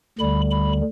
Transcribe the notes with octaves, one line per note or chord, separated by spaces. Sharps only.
D2 D3 G3 B5
B5